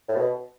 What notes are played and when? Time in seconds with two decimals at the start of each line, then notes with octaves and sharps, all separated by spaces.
0.08 A2
0.16 B2